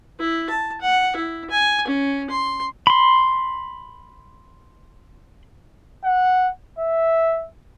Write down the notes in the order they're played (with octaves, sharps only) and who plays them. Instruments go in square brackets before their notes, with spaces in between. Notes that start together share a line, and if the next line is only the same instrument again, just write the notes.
[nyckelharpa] E4
A5
F#5
E4
G#5
C#4
C6
[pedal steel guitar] B5 C6
[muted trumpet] F#5
E5